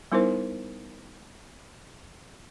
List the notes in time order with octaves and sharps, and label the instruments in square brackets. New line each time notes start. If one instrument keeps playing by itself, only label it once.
[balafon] G3 B3 D#4 E4 A#4 C5